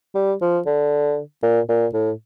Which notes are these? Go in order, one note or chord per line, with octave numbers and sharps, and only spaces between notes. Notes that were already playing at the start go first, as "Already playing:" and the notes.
G3
F3
D3
A#2
A#2
A2